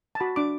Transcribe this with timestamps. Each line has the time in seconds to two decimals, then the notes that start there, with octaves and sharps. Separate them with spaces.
0.15 A5
0.20 F#4 B5
0.36 D4 D6